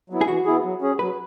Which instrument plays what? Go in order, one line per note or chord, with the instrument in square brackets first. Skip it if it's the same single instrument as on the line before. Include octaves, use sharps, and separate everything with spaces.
[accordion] F#3 B3 E4
[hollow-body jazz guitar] G#4
[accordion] E3 [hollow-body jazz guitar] F#4
[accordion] B3 E4 G#4
F#3
C#4 G#4
[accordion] F#3 [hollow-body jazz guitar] B4